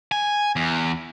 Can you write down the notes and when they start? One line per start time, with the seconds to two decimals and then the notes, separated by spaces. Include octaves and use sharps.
0.12 G#5
0.56 E2